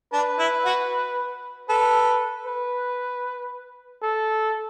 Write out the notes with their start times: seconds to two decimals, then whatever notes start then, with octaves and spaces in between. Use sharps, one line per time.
0.12 D4 B4
0.39 E4
0.65 F#4
1.69 A4 B4
2.46 B4
4.03 A4